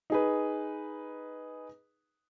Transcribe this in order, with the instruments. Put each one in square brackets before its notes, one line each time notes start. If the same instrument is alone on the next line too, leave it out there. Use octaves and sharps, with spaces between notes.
[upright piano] D#4 G#4 B4